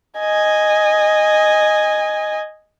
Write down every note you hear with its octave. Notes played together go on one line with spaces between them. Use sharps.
D#5 G#5